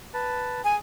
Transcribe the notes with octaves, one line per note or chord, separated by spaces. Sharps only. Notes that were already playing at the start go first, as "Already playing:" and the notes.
B4 A5
G#4 G#5